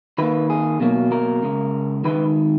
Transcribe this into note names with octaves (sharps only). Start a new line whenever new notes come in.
D#3 A#3 B4
G#4
B2 F#3 A#3
A#4
C#3 G#3
D#3 G#3 B4